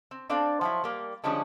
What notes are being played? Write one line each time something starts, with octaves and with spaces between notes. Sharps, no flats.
C4
C4 D4 A4 D5 F5
F3 F#3 E4
G3 A#3
D3 F3 G3 G#3 C#4 D4